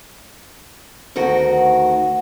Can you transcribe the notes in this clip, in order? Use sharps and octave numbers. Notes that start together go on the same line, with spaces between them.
D2 D#3 F#4 F#5